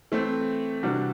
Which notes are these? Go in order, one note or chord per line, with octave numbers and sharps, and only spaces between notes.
E3 A3 C4
C3 E3 G3 D4 F#4